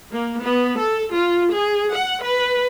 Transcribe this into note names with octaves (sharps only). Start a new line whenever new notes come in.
A#3
B3
A4
F4
G#4
F#5
B4